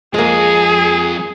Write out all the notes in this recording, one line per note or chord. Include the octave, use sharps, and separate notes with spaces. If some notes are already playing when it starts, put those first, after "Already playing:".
F3 G#3 A#3 C4 G#4